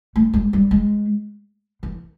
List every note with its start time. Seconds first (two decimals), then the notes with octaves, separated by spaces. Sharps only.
0.16 A3
0.34 G#3
0.53 G3
0.71 G#3
1.83 E3